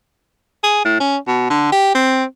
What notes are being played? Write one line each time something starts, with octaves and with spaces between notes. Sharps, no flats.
G#4
A2
C#4
B2
D3
G4
C4